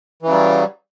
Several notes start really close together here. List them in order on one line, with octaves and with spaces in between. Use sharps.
E3 C#3 F#3 G3